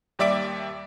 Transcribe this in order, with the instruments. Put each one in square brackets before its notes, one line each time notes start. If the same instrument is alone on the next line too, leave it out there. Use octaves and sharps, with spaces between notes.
[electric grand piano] D#2 G3 D5 E5 D6 D7